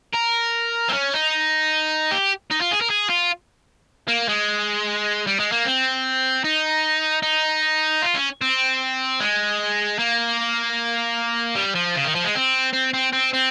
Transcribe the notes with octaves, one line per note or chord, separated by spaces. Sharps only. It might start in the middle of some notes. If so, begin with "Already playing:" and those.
A#4
C4
C#4
D#4
G4
D#4
F4
G#4
A#4
G#4
F4
A#3
G#3
G3
G#3
A#3
C4
D#4
D#4
F4
C#4
C4
G#3
A#3
G3
F3
C#3
D#3
F3
G#3
C4
C4
C4
C4
C4